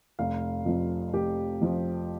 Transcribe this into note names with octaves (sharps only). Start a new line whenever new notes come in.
F1 F5
F2 F3
F1 G4
F2 F3